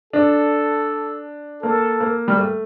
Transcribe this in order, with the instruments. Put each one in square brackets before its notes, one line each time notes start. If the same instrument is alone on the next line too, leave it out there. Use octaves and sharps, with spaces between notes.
[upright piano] D4 [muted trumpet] A4
[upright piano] A#3 [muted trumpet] A4
[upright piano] A#3
G3
A3